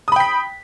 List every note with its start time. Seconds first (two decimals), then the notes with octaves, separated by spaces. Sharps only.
0.08 D#6
0.12 B5
0.16 G5
0.20 B6